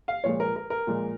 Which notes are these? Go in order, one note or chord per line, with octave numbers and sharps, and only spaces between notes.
F5
A#2 F3 G#3 C#5
A#4
A#4
A#4
A#2 F3 G#3